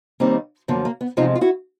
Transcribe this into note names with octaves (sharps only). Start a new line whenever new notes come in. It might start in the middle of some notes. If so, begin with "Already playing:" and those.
D#2 D#3 G3 A#3 C4
F#2 D3 F3 A#3 B3
A#3
B3
E2 C3 F3 G#3 D#4 F4
F4
E4 F#4